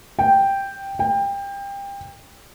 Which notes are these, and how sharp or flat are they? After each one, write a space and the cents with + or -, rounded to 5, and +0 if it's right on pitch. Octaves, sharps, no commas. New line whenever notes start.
G5 +0
G5 +25